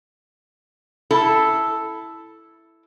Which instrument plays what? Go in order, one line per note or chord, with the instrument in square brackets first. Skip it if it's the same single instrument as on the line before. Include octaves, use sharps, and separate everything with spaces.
[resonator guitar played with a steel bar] E4 A4 A5